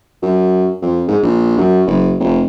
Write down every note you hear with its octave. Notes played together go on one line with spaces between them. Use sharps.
F#2
F2
G#2
A#1
F#2
F#1
F1